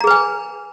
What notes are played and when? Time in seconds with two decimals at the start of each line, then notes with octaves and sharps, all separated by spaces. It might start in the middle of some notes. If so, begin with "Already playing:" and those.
0.01 A#5
0.04 G#4
0.07 B4
0.11 G#5